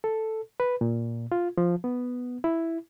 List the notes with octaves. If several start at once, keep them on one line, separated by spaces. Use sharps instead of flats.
A4
B4
A#2
F4
F3
B3
E4